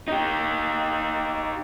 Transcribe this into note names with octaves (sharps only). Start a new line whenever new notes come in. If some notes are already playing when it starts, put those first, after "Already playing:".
D#4 G4